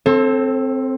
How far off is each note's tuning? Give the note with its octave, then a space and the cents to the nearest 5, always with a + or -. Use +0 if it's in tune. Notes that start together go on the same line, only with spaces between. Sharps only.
C4 +0 A4 +0 C5 +45